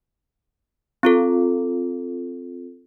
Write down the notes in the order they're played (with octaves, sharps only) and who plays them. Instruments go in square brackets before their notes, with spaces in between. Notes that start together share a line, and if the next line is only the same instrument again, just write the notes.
[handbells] C4 F4 A4